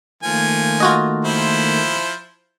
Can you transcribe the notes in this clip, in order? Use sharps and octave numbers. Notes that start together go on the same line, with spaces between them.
D#3 F3 A3 A#3 G#5
F4 F#4 D#5
F3 E4 C5